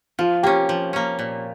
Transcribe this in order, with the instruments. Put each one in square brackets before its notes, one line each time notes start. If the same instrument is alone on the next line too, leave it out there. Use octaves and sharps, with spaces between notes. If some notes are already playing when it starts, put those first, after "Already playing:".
[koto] F3 [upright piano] F4
[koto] A#3 C#4 [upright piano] G4
[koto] F3
A#3 C#4
A#2